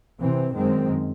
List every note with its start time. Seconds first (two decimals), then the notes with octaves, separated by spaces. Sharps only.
0.21 C3 E3 C4
0.55 F#2 D#3 G#3 C4